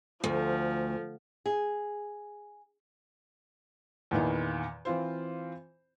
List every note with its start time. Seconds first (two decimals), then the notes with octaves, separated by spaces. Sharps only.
0.24 D2 F3
1.46 G#4
4.11 E2 A#2 D#3 E3
4.85 E3 C4 F4 C5